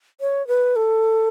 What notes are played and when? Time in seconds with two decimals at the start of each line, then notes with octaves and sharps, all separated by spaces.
0.21 C#5
0.48 B4
0.76 A4